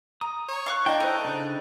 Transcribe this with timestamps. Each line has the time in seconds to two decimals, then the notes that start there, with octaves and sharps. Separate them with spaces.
0.21 A#5 D#6
0.48 C#5
0.66 F5 C#6 F#6
0.86 D4 E4 D#5 G5 A#5
1.00 A3 D#4 C5 B5
1.25 C#3 D4